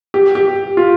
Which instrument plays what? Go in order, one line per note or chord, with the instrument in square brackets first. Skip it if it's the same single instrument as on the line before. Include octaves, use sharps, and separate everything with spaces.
[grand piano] G4
G4
F4